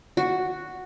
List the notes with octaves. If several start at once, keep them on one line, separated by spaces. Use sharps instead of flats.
F#4